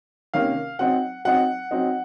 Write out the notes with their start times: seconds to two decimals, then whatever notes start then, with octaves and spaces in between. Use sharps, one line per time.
0.34 C3 D#3 A#3 C#4 F5
0.79 F#3 C4 D#4 F#5
1.25 F#3 C4 D#4 F#5
1.71 F#3 C4 D#4